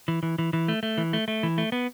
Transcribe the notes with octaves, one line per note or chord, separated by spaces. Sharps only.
E3
E3
E3
E3
A3
A3
E3
A3
A3
E3
A3
B3